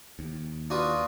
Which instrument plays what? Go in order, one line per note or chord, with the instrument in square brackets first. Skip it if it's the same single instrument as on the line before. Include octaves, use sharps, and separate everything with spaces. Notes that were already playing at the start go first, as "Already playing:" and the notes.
[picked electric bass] D#2
[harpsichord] D4 F#4 B4 [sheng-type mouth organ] F4 D#6